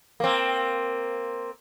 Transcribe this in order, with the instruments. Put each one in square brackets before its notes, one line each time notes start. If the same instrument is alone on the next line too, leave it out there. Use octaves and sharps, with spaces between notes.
[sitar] A#3 C4